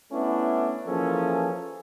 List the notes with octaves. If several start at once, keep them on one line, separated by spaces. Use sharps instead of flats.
A3 B3 C#4 D4 E4
E3 F3 A#3 C#4 G#4 A4